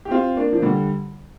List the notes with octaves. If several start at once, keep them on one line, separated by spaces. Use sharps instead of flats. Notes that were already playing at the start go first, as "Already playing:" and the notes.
G4
C4 F4
A#3 D4
F3
D3 G3